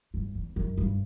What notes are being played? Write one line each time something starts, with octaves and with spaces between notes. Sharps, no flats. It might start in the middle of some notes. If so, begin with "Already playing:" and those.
G2
E2
F#2
G2